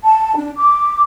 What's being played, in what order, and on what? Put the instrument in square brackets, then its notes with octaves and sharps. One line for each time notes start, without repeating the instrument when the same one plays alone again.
[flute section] A5
D4
D6